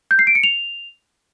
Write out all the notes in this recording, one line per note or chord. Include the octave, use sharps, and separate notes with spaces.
G6
C7
D7
C#7
F7